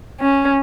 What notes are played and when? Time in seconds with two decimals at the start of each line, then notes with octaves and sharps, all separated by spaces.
0.20 C#4